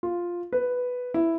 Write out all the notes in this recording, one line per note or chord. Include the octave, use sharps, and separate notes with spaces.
F4
B4
E4